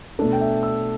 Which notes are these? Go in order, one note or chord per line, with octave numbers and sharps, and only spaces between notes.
B2 A3 D4 A4
G5
E5
E6